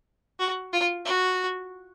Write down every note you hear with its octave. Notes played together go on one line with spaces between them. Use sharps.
F#4
F4
F#4